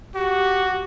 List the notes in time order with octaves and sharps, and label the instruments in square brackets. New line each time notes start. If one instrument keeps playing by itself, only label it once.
[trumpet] F#4 [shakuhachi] G4